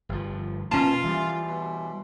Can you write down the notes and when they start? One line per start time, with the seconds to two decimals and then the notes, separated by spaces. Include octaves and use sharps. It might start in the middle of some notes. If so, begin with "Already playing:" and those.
0.09 G1 F3
0.71 B2 A#3 C#4 F4 A5
1.04 E3 G3 E5 G#5 C6
1.47 B2